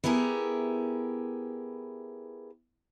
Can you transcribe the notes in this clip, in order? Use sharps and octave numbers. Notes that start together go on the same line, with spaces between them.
B3 E4 G4 G#4 A#4